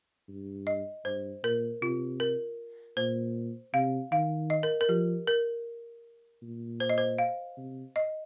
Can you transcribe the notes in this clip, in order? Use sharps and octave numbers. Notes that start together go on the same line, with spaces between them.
G2
D#5
G2 C5
A#2 A#4
C3 F4
A#4
A#2 C5
C3 F5
D#3 F5
D#5
A#4
A#4
F3 G4
A#4
A#2
C5
D#5
C5
F5
C3
D#5